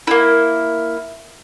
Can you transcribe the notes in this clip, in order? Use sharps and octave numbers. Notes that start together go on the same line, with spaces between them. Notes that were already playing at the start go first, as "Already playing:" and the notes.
A#3 E4